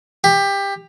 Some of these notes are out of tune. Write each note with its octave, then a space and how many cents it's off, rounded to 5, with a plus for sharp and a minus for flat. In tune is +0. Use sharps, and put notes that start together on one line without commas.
G4 +20